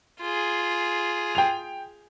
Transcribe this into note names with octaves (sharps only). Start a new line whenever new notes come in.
F4 G#4
G5 F7